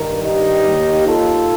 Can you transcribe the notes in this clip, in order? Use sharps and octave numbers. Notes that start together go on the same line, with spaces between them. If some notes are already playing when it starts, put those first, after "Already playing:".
Already playing: G2 D#3 A#4
D#4 G4
D#2 D#3
F4 A4